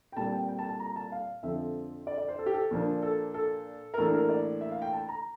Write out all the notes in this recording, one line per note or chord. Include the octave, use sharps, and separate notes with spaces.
G5
A#2 G3 C4 A5
G5
G5
A5
A5
A#5
A5
F5
F2 D3 F3 C4 E5
D5
D5
C5
A4
G4
A4
A#2 F3 A#3 D4
A4
A4
A#4
A2 E3 A#3 D4 A4
A#4
D5
E5
F5
G5
A5
A#5